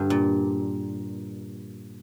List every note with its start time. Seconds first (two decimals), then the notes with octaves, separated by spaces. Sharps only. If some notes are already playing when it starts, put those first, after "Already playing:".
Already playing: G2 D3
0.10 A#2